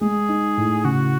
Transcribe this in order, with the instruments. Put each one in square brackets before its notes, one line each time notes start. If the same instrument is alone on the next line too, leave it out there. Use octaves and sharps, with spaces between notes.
[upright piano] G#3 [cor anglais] G#4
[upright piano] D#4
A2
[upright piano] C#3 [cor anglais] F#4